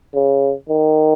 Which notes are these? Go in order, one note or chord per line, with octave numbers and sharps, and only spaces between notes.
C#3
D#3